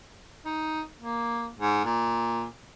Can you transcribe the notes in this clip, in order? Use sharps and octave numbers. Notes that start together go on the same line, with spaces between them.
D#4
A#3
G#2
A#2